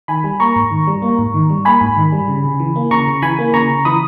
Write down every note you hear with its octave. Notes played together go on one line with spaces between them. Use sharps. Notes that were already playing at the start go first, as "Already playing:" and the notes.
D#3 G#5 B5
G3
A#3 A#5 C#6
G#2
D#3
G3
A#3
G#2
D#3
G3
A#3 G#5 B5
G#2
D#3
G3
C#3
C#3
E3
A#3
C#3 A#5 C#6
C#3
E3 G#5 B5
A#3
C#3 A#5 C#6
C#3
E3 B5 D#6